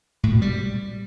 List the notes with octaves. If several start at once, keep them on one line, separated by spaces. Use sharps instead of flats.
A2
B2
G3